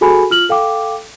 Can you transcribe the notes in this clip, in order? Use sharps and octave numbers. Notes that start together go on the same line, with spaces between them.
F#4 G#4 A4 G#5 B5
F4 F6 F#7
A4 F5 G5 D6